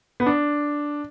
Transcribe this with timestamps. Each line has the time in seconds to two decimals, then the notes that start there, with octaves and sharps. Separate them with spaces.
0.20 B3
0.26 D4